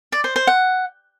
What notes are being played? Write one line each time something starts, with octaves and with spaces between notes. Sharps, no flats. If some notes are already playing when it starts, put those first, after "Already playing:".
D5
C5
C5
F#5